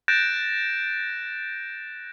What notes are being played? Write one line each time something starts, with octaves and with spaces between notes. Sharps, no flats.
F#6 G6 A6 A#6 D7 E7